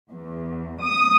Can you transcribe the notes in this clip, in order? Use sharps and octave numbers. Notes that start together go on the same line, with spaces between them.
E2
D#6